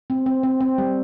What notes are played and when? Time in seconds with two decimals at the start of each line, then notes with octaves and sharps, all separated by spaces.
0.10 C4
0.26 C4
0.43 C4
0.61 C4
0.78 G3